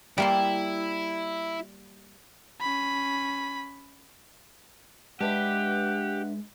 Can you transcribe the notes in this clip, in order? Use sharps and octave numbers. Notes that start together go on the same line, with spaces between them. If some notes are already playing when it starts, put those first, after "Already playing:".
G3 A#3 E4 C6
C#4 B5
G#3 D4 G4 B4 E5 F#5